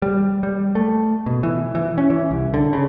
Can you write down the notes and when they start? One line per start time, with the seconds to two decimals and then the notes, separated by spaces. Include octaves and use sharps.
0.02 G3
0.43 G3
0.75 A3
1.26 B2
1.43 E3
1.75 E3
1.98 C#4
2.10 E3
2.31 C2
2.54 D3
2.73 C#3